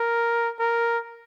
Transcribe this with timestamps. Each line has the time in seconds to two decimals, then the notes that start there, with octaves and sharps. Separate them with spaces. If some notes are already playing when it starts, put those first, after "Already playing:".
Already playing: A#4
0.59 A#4